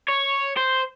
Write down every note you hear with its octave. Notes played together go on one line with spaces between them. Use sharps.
C#5
C5